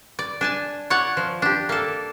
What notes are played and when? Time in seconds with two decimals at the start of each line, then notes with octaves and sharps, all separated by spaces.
0.19 D5
0.41 D4 G#5 A5
0.90 C#5 D5 F#5
1.17 F3
1.42 D4 G4
1.69 A#3 A4